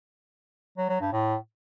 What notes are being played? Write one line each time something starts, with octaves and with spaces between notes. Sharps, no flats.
F#3
F#3
G2
A2